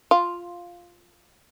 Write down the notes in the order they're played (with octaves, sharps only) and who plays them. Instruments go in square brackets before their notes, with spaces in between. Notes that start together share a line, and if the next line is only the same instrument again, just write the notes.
[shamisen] F4